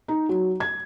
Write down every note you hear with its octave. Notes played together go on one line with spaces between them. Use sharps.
D#4
F#3
G#6